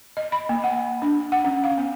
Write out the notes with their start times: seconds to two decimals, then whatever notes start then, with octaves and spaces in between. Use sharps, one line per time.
0.17 D#5
0.32 B5
0.49 A#3
0.64 F#5
1.02 D4
1.32 F#5
1.45 C#4
1.64 F5
1.78 B3